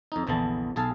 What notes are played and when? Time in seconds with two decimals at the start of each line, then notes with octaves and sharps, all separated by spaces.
0.12 F2 D#4
0.27 A#1 E2 D3 E3 A5
0.76 B1 G#4 A4 F5 A5